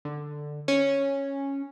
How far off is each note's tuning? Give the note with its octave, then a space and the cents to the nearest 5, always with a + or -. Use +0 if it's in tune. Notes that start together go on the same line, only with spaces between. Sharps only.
D3 +10
C#4 -5